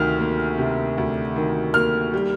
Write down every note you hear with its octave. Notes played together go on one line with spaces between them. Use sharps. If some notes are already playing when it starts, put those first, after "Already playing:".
Already playing: D2 C3 D#3 F6
A#3
C3
D2
D#3
A#3 F6
G3